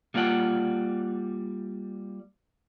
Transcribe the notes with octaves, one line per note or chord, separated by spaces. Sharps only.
G3 A#3 F4 D5 F#5